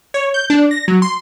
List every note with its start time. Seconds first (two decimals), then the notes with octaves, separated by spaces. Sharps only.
0.14 C#5
0.34 G6
0.50 D4
0.71 A#6
0.88 F#3
1.02 C6